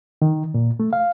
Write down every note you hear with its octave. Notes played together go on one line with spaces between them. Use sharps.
D#3
A#2
A3
F5